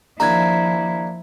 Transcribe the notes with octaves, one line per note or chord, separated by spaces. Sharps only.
D#2 F3 D4 E4 A#5 B5 G#6